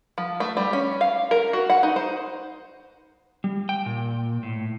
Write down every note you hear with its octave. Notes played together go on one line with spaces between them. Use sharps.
F3
A3
G3
C#4
F5
A#4
F#4
F#5
D#4
C5
G3
G5
A#2
A2